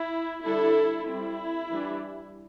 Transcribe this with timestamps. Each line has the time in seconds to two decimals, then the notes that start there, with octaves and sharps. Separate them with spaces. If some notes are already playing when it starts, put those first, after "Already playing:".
Already playing: E4
0.44 D3 G3 D4 E4 A4
1.07 G3 C4 E4
1.71 E3 G3 D4